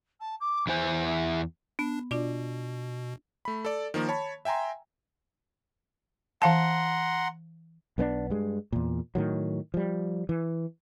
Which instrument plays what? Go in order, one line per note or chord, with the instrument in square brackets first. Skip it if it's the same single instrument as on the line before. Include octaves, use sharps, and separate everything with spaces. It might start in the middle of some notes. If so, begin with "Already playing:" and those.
[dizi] A5
D6
[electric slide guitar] E2 E4 G#5 [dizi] C5
[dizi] E5
[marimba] B3 [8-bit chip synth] D4
[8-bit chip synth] B2 [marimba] D4 F4 D5
[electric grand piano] A3 B5
A4 D5
D#3 F3 A#3
C#5 A5 B5
E5 G5 G#5 A#5 C6
[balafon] E3 F5 A5 [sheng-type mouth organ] F#5 A#5 C6
[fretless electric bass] B1 B3 C4 D4
G2 G#3
E2 A#2
A2 D#3 F#3
F3 G3
E3